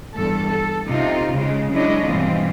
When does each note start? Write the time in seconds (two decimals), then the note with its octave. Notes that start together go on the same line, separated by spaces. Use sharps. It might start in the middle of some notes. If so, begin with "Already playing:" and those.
0.15 E2 G2 A4
0.49 A4
0.87 C3 D#4 F4
1.32 C#3 G#3
1.73 F#3 G#3 D4 E4 C#5 D#5
2.05 G2 B2 E3 C4 F4